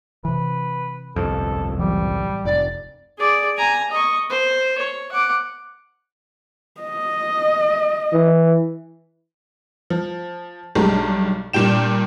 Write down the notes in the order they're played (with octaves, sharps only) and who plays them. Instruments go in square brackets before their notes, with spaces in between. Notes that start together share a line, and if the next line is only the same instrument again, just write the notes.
[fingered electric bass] C3 E3 [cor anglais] B4
[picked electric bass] G1 C2 F2 [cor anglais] A4
[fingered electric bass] A1 E3 F#3 [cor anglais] G3
[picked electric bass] F1 [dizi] D5
[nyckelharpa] G#4 D5
G#5 A#5
D#5 C#6
C5
C#5
F#5 D6
[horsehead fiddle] D#5
[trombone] E3
[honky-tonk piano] F3
B1 G2 G#3 G4 A#5
G2 A#2 G4 G5 E7